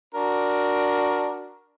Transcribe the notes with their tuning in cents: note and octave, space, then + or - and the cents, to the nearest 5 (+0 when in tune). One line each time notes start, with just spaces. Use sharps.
D4 +0 F#4 +0 A#4 +10